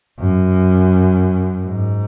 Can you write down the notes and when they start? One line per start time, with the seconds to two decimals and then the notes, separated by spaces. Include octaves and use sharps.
0.19 F#2
1.63 G#2